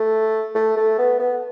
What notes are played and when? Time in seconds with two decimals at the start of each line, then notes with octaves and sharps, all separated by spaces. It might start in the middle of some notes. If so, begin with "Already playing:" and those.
Already playing: A3
0.55 A3
0.77 A3
0.98 B3
1.19 B3